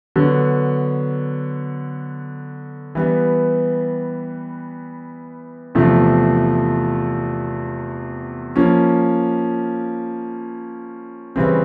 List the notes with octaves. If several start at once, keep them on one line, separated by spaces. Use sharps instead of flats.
D3 F#3 B3
E3 G3 B3
E2 C3 F3 A3
F3 A#3 C#4
C#3 E3 G3 C4